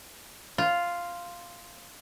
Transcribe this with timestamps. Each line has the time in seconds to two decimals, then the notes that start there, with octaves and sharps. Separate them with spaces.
0.58 F4